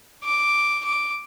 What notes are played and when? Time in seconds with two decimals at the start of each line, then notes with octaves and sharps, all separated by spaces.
0.24 D6
0.85 D6